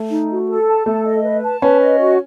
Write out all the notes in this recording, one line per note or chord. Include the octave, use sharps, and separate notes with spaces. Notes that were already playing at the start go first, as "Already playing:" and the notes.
Already playing: A3
D#4
F#4
A4
A5
A3 A4
D#5
B4
A5
C#4 B4
D#5
F#4